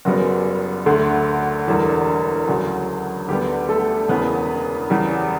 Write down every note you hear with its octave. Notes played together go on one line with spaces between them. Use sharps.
F#1 F#2 C#3 G3 B3 F#4
D2 D3 A3
E1 E2 D3 G3
D2 C#3 F#3
D2 D3 G3 B3 G4
A3 A4
E1 E2 C#3 B3 B4
E2 C#3 G3